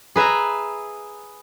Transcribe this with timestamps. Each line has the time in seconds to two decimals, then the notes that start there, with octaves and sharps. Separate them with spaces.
0.16 G#4 B4 E5 A#5